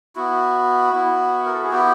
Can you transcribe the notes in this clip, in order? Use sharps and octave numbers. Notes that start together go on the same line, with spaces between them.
B3 E4 F#4
B3 E4
A#4
A4
G#4
B3 E4 G4